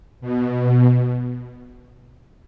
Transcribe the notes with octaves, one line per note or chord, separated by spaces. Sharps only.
B2